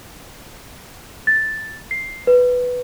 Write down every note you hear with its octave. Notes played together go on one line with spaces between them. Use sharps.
A6
C7
B4